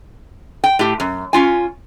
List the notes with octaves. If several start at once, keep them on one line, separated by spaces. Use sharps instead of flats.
G5
A2 G4
F#2
C#4 F4 G#5